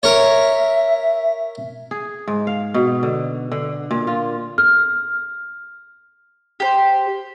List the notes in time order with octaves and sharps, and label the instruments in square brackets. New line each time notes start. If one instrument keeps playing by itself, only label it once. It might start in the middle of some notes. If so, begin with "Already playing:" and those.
[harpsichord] A#4 C#5 [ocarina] E5
[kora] G#4
G#2
F5
B2
D3
D3
A#2
F4
[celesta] F6
[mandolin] G4 C5